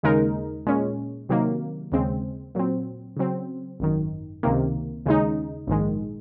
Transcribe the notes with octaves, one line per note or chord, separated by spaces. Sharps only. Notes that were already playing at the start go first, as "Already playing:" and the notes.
D#2 C#3 G#3 D#4 A#4
A#2 G#3 C#4
C3 D#3 F#3 A#3
D#2 C#3 G#3 C4
A#2 F#3 C4
C#3 F#3 C4
G#1 F#2 D#3
C#2 C3 D#3 A#3
D#2 C#3 G#3 D#4
A#1 G#2 D#3 G#3